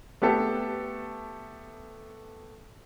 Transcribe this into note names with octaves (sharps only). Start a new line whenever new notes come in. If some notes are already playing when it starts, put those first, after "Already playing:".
A3 B3 G4 A4